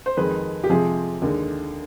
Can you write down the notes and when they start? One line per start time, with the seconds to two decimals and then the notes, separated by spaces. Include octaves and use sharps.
0.06 C5
0.17 F2 D#3 G#3 B4
0.64 G4
0.69 F2 C3 F3 G#3 G#4
1.22 D#2 D3 G#3